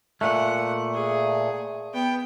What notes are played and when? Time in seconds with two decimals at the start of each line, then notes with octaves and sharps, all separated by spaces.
0.21 A#2 A3 F#5
0.94 G#4
1.93 B3 G5